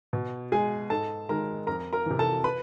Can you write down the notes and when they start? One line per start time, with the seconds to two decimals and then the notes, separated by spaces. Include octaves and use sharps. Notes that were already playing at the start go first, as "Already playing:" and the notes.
0.13 B2
0.52 G#3 G#4 G#5
0.90 G#2 A4 A5
1.29 D#3 G#3 A#4 A#5
1.67 F2 A#4 A#5
1.93 A#4 A#5
2.06 C3 E3
2.19 A4 A5
2.44 B4 B5